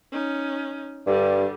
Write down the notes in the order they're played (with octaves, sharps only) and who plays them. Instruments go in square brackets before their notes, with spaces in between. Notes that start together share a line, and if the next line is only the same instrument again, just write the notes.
[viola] C#4 D#4
[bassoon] G2 [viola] D3 G3